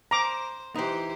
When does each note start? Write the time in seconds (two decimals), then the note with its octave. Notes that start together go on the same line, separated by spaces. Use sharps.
0.11 C5 A#5 D6
0.76 E3 D#4 G4 C5